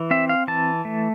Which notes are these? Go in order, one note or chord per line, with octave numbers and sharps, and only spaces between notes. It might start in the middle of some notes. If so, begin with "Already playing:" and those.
Already playing: E3
C4 E5
F5
E3 A5
A3